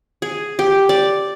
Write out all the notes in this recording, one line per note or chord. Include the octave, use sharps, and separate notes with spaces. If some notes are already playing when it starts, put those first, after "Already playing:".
G#4
G4
D5